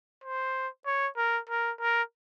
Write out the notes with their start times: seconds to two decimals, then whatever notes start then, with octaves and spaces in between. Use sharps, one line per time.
0.24 C5
0.86 C#5
1.17 A#4
1.49 A#4
1.80 A#4